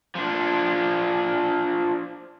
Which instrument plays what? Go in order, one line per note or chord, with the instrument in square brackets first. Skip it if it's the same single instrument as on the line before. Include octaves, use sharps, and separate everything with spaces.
[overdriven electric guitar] F3 D4